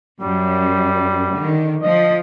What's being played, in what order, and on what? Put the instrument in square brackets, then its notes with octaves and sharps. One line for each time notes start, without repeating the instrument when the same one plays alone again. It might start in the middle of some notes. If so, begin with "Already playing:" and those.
[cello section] F#2 [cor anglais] G3
[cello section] D3 D#3
[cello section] F3 [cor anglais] D#5